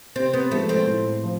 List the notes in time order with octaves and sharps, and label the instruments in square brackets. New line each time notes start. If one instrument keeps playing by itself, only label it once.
[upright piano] C3 [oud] C4
[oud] B3
[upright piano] F3 G#3 B3 [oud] A3
[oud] C4
[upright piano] A2
F3